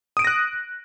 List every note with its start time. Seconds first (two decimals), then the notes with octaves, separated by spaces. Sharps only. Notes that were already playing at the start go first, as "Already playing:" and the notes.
0.17 D#6
0.19 D7
0.22 D#7
0.25 A#6
0.27 F#6